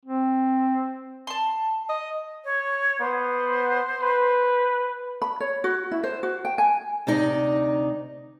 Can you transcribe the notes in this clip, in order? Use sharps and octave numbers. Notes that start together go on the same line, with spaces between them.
C4
A5 C6
D#5
C#5
B3 C5
B4
B5
C#5
F#4
E4
C5
F#4
G5
G#5
D2 C3 D#4 D5